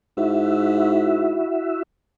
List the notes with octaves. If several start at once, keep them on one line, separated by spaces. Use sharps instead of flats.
G#2 E4 F#4 E5